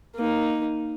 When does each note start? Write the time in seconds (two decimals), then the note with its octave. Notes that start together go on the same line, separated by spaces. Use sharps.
0.16 A#3 D#4